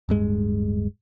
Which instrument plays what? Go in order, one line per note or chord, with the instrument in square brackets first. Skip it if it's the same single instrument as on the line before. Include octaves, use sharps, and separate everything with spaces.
[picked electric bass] D1 G2 G#3